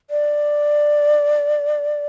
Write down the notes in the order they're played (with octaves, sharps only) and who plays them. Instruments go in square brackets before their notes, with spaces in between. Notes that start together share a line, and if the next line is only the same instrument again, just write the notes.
[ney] D5